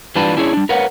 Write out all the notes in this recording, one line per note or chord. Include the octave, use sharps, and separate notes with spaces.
E3 G3 D4 F4 B4 A5
C#4 D4 E4 G#4 C5 C#5
G3 D4
A#4 B4 C#5 F5 F#5